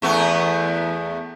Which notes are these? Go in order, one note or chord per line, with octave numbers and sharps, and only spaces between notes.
E2 A3 B3